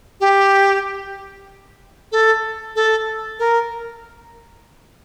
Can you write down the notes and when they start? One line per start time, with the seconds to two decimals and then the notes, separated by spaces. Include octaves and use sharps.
0.20 G4
2.12 A4
2.76 A4
3.39 A#4